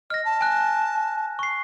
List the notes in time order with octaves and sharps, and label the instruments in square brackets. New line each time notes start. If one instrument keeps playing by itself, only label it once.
[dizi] D#5 [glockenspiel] F6 A#6
[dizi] A5
[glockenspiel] G#5 F#6
C#6 C7